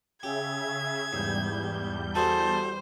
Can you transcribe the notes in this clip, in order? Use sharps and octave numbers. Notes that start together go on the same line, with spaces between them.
C#3 G4 G#4 E5 G#6
E2 G#2 G3 G6
F#4 G#4 A4 C5 A5